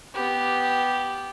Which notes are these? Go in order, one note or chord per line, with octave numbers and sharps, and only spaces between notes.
B3 G4